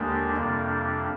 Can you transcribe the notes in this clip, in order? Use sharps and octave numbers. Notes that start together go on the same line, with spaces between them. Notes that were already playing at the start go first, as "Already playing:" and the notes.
Already playing: D#2 D3 G#3 A#3 D4 G4
F2 C3 G3 A#3 D4